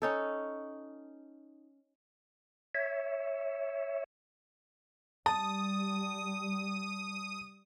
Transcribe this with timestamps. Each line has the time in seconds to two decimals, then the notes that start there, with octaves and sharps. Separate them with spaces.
0.02 C#4 D#4 A4
2.75 C#5 E5
5.26 G3 A5 D#6